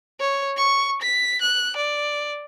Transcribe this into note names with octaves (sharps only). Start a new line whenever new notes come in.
C#5
C#6
B6
F#6
D5